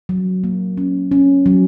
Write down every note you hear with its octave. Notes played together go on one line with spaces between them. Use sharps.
F#3
A#3
C#4
C#4
F#3